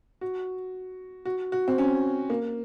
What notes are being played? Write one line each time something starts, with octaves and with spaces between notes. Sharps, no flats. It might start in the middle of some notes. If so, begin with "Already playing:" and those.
F#4
F#4
F#4
C4
C#4
A#3